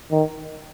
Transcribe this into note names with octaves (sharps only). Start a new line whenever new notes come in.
D#3